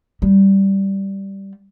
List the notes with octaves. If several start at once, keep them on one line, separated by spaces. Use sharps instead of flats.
G3